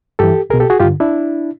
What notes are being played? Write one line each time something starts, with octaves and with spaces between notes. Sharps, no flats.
G2 E3 G4 A4
C2 B2 G#4 A#4
G4 A4
F#4 G#4
G2 D3 F4 G4
D4 E4